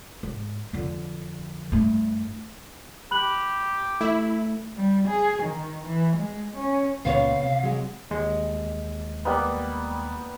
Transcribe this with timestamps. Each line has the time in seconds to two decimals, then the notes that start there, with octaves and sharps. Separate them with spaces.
0.23 G#2
0.73 F2 D3
1.72 G2 A3
3.11 G4 B5 F#6 F#7
4.01 A3 E4
4.77 G3
5.07 G#4
5.42 D#3
5.85 E3
6.16 G#3
6.56 C#4
7.05 C#2 A#2 C#3 B3 C5 C#5 F5
7.43 C3
7.63 F#3 G#3
8.11 D#2 G#3
9.25 G3 A#3 B3